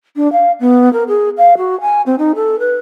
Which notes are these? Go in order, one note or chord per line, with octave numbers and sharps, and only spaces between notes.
D4
F5
B3
A#4
G#4
F5
F#4
G#5
C4
D#4
A4
B4